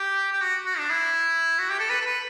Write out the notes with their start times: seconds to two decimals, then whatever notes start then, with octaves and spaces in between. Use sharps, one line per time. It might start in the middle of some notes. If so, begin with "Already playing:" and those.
Already playing: G4
0.32 G4
0.41 F#4
0.65 F#4
0.78 D4
0.90 E4
1.59 F#4
1.70 G4
1.79 A4
1.90 B4
2.01 A4
2.06 B4